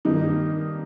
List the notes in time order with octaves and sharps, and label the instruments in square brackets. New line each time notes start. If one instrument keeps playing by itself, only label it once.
[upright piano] G2 D#3 A#3 D#4